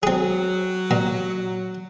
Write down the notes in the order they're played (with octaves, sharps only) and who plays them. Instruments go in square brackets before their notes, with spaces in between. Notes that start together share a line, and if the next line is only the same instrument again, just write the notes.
[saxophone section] F#3 [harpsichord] C4 G#4
[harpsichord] A#2